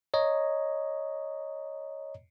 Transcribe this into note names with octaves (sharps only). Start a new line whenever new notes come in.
C#5 D#5 A#5